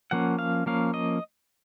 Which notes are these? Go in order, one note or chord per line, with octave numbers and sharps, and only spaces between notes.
F3 A#3 C#4 F#5
F5
F3 A#3 C#4 F5
D#5